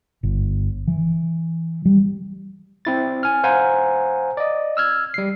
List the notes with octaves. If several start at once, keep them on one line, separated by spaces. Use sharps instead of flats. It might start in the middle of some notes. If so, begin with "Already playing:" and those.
G1
E3
G3
C4 E4 A6
G#5 F6
C5 F5 F#5 G#5 A#5
D5 D#5
E6 F6 G#6
G3 C7